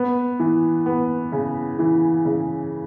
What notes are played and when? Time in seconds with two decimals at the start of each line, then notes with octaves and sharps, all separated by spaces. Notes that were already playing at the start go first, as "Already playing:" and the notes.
Already playing: B3
0.40 E3
0.86 B3
1.32 C#3
1.79 E3
2.25 C#3